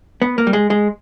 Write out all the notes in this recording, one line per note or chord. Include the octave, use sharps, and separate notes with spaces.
B3
A#3
G3
G#3
G#3